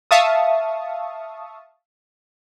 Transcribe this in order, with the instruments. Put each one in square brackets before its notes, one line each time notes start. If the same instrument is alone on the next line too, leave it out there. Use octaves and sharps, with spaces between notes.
[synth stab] E5 F5 A5 C#6 D#6